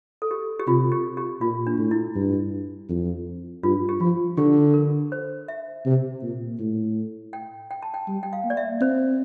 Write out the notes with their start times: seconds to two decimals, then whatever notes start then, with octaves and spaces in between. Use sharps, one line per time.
0.22 A4
0.31 G4
0.59 G4
0.67 C3 F4
0.92 G4
1.17 G4
1.41 A#2 F4
1.67 D4
1.78 A2
1.91 E4
2.15 G2
2.89 F2
3.63 G2 F4
3.89 G4
4.00 F3 F4
4.37 D3 G4
4.74 A#4
5.12 C5
5.48 E5
5.85 C3
6.22 A#2
6.59 A2
7.33 G5
7.71 G5
7.83 A5
7.94 G5
8.08 G3
8.23 G5
8.33 F5
8.44 A#3
8.50 D5
8.57 E5
8.81 C4 C5